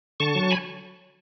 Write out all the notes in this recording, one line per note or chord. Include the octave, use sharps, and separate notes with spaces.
D3 A5 C#6
F#3
G#5 B5